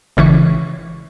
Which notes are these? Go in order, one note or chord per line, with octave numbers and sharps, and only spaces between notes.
G#1 C#3 E3 C#6